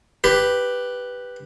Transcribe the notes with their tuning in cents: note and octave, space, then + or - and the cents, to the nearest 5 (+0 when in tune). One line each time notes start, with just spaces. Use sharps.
G4 +0 B4 +0